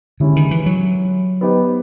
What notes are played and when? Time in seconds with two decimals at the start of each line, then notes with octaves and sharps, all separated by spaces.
0.20 D3 G#3 C#4 E4 G4
0.36 D#3
0.51 E3
0.66 F#3
1.41 B3 D#4 G4 C5 D#5